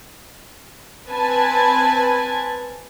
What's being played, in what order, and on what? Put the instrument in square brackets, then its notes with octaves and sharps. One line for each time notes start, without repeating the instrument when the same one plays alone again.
[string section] C4 B4 G#5 A5